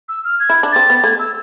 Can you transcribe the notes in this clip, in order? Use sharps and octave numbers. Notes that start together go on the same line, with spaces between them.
E6
F6
G#6
E4
D4
C4 A6
B3
A3 G#6
E6